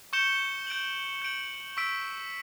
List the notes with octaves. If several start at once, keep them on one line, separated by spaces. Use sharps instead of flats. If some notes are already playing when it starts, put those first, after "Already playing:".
C#6 G6 C#7 E7 G7
G6 D7 F#7
G6 D7 F#7
C#6 E6 B6 D7